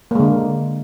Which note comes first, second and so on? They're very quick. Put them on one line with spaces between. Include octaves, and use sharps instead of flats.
A#3 G#3 D3